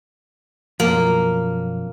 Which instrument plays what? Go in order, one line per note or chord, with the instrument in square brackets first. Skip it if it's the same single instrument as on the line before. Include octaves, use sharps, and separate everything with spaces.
[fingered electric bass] F#2 B2 F3 [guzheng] A#3